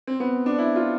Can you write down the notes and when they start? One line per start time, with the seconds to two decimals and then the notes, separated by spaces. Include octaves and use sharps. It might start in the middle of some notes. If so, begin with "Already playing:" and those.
0.07 C4
0.20 B3
0.46 D4
0.59 E4
0.76 F4